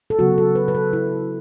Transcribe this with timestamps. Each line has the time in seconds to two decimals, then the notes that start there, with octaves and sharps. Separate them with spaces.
0.10 A4
0.19 C#3 F#3 B3 F#4
0.38 A4
0.55 B4
0.68 B4
0.75 A4
0.93 E4